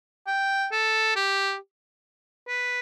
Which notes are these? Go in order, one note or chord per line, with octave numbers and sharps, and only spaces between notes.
G5
A4
G4
B4